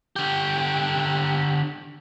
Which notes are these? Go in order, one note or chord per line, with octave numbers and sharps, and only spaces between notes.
D3 G4